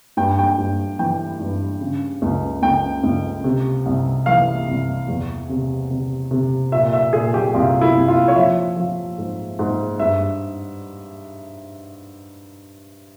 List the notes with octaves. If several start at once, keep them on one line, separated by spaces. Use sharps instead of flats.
G2 G5
G5
G2
E3 G5
G2
C#3
C#2
C#2 G5
C#2
C3
C2
E3 F5
C2
E2
C3
C3
C3
A#2 E5
E5
A#2 G#4
G4
C2 F4
E4
C2
F4
C#5
F3 E5
F3
G#2
G#2
G2 E5